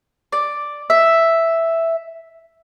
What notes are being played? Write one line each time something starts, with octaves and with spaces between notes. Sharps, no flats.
D5
E5